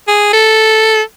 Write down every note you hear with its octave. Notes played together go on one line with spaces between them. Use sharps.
G#4
A4